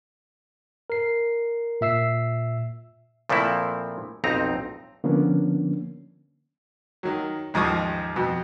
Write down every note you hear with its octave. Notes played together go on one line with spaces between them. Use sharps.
A#4 C7
A#2 E5 E6 C7
A#2 F3 A3 C4 E4
B1 F2 C4 D#4 A#5
D3 F3 A#3 B3 C#4 D4
D#3 F#3
A1 D#2 G#2 F3 C#6 D#6
F2 B2